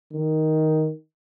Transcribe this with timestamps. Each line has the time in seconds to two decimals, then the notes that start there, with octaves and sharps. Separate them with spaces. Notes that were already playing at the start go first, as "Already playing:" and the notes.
0.13 D#3